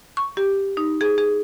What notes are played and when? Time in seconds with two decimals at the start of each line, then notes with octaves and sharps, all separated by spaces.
0.17 C#6
0.37 G4
0.77 D#4
1.01 G#4
1.18 G#4